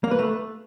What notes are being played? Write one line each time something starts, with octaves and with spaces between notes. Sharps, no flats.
A#3
B4
A3